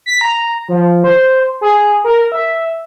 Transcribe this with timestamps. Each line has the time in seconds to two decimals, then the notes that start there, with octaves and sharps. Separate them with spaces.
0.06 B6
0.21 A#5
0.69 F3
1.04 C5
1.61 G#4
2.04 A#4
2.32 E5